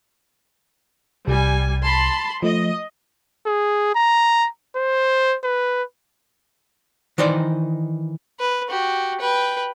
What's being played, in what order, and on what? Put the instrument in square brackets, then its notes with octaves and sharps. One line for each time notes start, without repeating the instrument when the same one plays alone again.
[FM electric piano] C2 [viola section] G3 G#5
[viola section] A5 B5 C6
[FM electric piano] F3 A3 [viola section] D#5
[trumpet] G#4
A#5
C5
B4
[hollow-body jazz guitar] D#3 E3 D#4 C5 D5
[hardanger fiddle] B4
F#4 G4
B4 G5